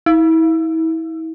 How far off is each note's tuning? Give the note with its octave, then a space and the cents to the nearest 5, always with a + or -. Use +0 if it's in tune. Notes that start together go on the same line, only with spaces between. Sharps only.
E4 -35